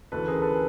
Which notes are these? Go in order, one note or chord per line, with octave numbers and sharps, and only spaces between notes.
D2 C#3 E3 A4 B4
G#4 A#4
A4 B4